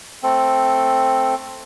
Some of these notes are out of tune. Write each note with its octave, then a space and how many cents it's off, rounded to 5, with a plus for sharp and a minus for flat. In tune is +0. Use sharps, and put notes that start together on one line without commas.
A3 +0 C4 +5 A4 +0